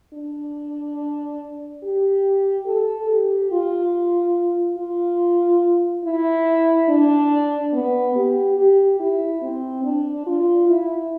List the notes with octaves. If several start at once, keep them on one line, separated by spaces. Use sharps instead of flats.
D4
G4
A4
G4
F4
F4
E4
D4
B3
G4
G4
E4
C4
D4
F4
E4